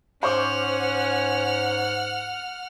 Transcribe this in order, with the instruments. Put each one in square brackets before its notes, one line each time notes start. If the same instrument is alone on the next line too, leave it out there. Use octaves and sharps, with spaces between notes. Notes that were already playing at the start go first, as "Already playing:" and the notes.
[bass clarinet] G#2 [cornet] C#4 [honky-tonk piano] C5 C#6 D6 [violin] F#5 F6